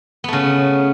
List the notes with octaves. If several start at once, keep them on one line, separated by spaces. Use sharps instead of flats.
C#3 A3 B3